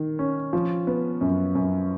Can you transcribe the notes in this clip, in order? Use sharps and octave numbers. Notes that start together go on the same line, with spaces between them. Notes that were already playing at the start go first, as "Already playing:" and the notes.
Already playing: D#3
C#4
F3
B3
F#2
F#2